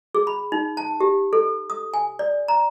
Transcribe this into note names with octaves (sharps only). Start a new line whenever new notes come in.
G#4
B5
D#4
A5
G4
A4
D#6
G#5
D5
A#5